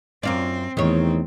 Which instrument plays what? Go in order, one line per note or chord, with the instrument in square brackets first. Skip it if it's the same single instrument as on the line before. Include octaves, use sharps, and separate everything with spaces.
[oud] F#2 F4 D5 [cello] C4
[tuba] E2 [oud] D#3 C#5 [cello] A3 C4